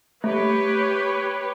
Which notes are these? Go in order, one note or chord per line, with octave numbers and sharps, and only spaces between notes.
A3 G4 B4 C#5